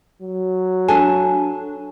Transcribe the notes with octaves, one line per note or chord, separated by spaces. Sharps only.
F#3
D4 A4 G#5